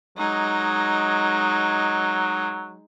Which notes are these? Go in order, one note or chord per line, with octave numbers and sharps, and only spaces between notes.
F#3 G#3 D#4